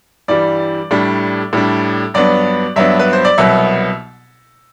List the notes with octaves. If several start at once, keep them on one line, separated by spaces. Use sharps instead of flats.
G2 E3 G3 D5
A2 G3 D4
A2 G3 D4
G2 F#3 B3 D4 D5
G2 F#3 B3 D4 E5
B4
C5
D5
C2 B2 F#3 B3 E5